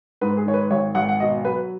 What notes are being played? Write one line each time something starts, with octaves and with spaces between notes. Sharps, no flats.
G#2 B4
G#4
D#3 C#5
B4
G#1 C#5
G#1 F#5
F#5
B2 D#5
F#3 B4